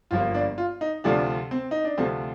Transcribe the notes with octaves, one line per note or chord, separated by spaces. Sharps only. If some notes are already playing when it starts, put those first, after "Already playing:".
G1 G2 F3 A#3 F4
D4
F4
D#4
D2 C3 F3 A3 D4
C4
D#4
D4
D2 C3 F3 A3 C4